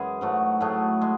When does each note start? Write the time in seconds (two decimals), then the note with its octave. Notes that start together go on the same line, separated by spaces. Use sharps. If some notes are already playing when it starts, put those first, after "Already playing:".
Already playing: F#2 E3 G#3 G#4
0.21 G#2 F#3 A3
0.60 A2 F#3 A3 G#4
1.01 G#3